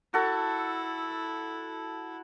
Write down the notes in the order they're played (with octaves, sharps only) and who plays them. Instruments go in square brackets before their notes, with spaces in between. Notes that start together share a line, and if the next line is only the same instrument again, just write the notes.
[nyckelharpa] E4 [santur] F#4 A4